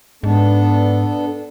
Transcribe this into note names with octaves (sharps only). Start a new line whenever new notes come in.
G#2 B3 D4 A4